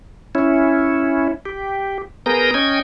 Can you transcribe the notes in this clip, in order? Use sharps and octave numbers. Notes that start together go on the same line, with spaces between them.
C#4 E4
G4
B3 G#4 A#4 A#5 D#6 G6
C#4 D#5 G5 G#6